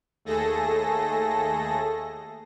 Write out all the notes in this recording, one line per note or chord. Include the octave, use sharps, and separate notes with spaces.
D#2 A3 G#4 A4 A#6